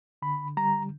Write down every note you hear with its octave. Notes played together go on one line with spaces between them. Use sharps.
D3 B5
G3 A#5